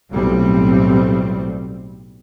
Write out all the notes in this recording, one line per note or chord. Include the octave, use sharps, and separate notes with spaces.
B1 A2 G3 C4